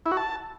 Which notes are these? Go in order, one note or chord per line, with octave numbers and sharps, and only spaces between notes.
E4
F#4
A5